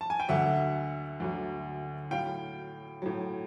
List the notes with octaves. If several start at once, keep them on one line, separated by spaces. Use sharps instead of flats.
A5
G#5
G5
D2 D3 F#3 E5 F#5
D2 D3 F#3
A2 F#3 F5 G5
A2 F#3